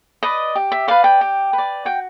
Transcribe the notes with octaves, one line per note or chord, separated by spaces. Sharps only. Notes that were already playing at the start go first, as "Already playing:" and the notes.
B4 D5 D#5
G4
E5
B4 D5 F5
G5
G4
B4
D5
F#4 G5